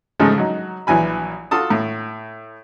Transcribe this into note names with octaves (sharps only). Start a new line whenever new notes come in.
G#2 C#3 F3 G#3 A3
F#3 D#4
A#1 E3 F#3 G#5 B5
F4 F#4 A4 A5 D#6
A2